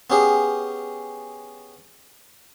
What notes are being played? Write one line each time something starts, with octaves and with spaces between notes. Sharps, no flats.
B3 C#4 G4 G#4